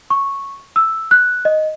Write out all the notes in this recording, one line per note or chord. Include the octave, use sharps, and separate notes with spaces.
C#6
E6
F#6
D#5